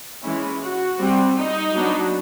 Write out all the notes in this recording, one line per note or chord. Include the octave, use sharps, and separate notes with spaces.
E3 G#3 C#4 E4
F#4
G3 C4
D#4
F#3 B3 D4